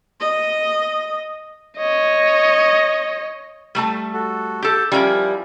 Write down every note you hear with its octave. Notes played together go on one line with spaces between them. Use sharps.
D#5
C#5 D#5
G3 A3 A5
F#4 A4
G4 A4 G6
F3 G3 C#4 E4 F4 A#4